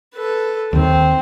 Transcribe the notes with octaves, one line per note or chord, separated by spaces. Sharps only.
A4 B4
D#2 D#3 C4